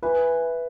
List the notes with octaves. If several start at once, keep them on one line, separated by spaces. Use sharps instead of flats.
E3 B4